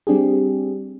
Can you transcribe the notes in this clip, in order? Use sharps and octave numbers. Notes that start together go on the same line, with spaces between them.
G3 C4 D4 G4 G#4